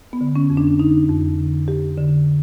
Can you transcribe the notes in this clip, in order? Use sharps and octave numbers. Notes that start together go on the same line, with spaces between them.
B3
D3
C#4
F2
D4
D3 D#4
F2
D3
F2 G4
D3